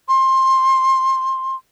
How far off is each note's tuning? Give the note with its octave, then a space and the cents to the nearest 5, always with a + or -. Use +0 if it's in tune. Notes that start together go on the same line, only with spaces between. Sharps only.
C6 +20